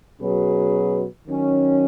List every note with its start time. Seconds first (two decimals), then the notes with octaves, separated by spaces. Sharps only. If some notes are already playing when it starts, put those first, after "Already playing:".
0.21 B2 F#3 C#4 G#4 B4
1.27 D#3 F#3 C#4